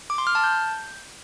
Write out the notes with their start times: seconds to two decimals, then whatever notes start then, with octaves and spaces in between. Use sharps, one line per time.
0.10 D6
0.18 C6
0.27 F6
0.35 A5
0.44 G6